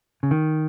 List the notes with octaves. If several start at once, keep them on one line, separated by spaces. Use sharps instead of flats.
C#3
D#3